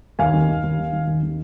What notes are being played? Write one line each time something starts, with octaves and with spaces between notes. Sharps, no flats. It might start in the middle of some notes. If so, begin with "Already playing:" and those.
D#2 F5 G#5
D#3
D#2
D#2
D#3
D#3
D#2
D#3